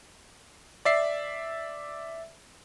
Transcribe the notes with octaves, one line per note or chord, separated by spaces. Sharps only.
D5 E5 C7